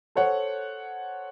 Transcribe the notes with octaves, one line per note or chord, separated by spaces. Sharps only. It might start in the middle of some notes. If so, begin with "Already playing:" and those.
A4 C5 C#5 F#5